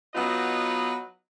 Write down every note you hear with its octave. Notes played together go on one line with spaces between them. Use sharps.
F#3 B3 D#4 F4 B4 D#5